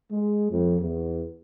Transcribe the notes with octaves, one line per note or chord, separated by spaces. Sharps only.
G#3
F2
E2